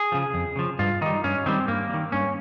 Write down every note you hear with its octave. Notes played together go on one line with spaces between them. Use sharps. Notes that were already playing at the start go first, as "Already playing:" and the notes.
Already playing: G#4
C#3 F3
F2
C#3 F3
G2 F4
D#3 G3 D#4
G2 C#4
D#3 G3 C4
G2 A#3
D#3 G3
G2 C#4